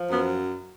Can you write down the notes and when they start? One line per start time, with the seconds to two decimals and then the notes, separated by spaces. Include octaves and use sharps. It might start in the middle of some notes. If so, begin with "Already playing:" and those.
Already playing: F3
0.11 F#2 B3